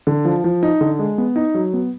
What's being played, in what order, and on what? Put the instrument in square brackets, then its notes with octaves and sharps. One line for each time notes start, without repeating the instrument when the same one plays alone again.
[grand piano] D3
F3
F3
D#4
D3
G#3
B3
D#4
F#3
B3